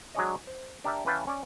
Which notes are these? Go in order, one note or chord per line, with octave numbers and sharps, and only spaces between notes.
F#3 G#3 D4 G#4 C#5 D#5
C5
D4 G4 A#4 D5 E5
E3 C#4 B4 F5 G5 A5
C#4 D5